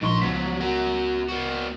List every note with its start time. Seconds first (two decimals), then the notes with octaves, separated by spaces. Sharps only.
0.02 A#1 G#2 D#4 C6 C#6
0.22 C#2 F3 F#3 B3 B6
0.60 F#4 A#4
1.29 A#3 F#4